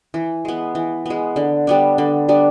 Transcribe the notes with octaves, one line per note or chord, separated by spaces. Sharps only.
E3
G#3 B3
E3
G#3 B3
D3
G3 B3 D4
D3
G3 B3 D4